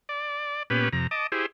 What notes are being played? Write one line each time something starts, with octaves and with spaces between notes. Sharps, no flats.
D5
A#2 B3 C#4 G4 B4
F2 C3 A#5
D#5 A5 D6
E4 G4 G#4 C5